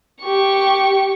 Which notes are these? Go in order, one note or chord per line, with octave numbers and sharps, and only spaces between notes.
G4 C#6